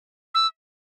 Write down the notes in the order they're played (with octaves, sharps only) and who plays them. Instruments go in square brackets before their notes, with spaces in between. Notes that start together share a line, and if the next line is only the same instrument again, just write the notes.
[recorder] E6